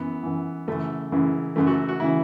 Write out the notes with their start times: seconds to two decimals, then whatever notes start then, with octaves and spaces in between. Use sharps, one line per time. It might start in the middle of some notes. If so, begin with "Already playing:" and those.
Already playing: F#2 E3 B3
0.23 F#2 E3
0.67 F#2 C#3 E3 A3
1.12 F#2 C#3 E3
1.56 F#2 C#3 E3 A3
1.67 F#4
1.89 F#4
2.00 C#3 E3 E4